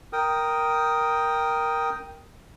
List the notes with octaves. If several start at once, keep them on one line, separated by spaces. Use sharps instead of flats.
A#4 G5 D#6